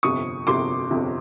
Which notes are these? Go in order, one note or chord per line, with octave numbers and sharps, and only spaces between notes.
G1 F2 C3 C#6 D#6
G1 F2 C3 C6 D6
G1 F2 C3